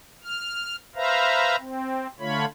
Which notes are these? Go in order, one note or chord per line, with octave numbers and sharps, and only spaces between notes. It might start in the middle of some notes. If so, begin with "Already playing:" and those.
F6
B4 C5 E5 F5 A#5
C4
D3 A3 F4 C#5 B5